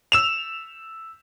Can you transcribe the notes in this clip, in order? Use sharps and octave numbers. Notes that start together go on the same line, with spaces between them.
E6 E7 F7